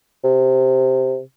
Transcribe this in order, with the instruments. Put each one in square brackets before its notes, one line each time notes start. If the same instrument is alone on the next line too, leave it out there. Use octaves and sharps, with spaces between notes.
[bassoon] C3